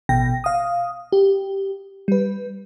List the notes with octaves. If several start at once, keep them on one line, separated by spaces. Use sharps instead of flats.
A1 B2 G5 A#6
F5 D#6
G4
G3 B4